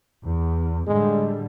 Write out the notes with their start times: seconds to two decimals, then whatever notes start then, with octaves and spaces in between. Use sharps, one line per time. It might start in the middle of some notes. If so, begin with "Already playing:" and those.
0.24 E2
0.87 A2 D3 G3 G#3